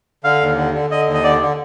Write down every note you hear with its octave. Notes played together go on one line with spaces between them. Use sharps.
D3 F5
D#2
D3
D3
D3 D#5
D#2
D#5
D3 D5
D3